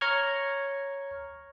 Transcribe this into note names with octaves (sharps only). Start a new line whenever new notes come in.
C#5 A#5 C#6 F6 G#6